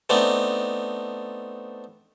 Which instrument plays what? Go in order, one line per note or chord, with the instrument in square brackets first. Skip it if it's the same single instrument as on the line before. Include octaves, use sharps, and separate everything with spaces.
[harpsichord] A3 B3 C4 D4 D#4